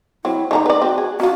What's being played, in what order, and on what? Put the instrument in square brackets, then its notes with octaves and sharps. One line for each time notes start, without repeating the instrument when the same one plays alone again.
[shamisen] F#3 C4 [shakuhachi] E4
[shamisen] D3 D4 A#5 [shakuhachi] D#4
[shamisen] B4 D5
[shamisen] C4 [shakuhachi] F#4
[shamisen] G#4
[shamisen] C#4 F4 [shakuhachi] F#4